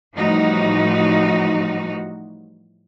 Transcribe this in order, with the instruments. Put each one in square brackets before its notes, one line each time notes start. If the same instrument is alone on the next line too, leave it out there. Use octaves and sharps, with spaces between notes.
[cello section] A2 E3 F3 G3 D#4 F#4